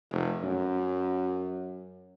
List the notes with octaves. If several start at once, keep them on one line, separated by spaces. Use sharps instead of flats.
F1
F#2